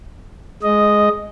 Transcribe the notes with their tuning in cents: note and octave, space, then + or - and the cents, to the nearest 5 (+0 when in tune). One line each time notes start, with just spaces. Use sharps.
G#3 +10 D#5 +0